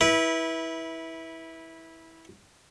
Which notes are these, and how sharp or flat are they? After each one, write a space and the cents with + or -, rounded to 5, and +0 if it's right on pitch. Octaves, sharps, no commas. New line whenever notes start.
E4 -15 B4 -25